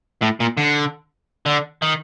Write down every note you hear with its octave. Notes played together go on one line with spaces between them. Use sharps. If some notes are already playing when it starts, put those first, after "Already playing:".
A2
A#2
D3
D3
D#3